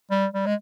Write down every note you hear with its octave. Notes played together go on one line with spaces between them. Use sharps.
G3
G3
G#3